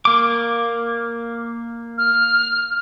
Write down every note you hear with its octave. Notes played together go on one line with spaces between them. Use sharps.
A#3 D6
F6